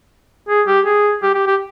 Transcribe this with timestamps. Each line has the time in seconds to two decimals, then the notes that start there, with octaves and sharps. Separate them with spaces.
0.49 G#4
0.67 G4
0.86 G#4
1.22 G4
1.35 G4
1.47 G4